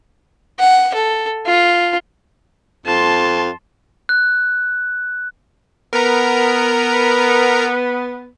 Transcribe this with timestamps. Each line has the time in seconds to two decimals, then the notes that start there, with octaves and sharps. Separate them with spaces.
0.59 F#5
0.94 A4
1.46 F4
2.86 F2 A5 C6
4.09 F#6
5.93 B3 A#4 A#5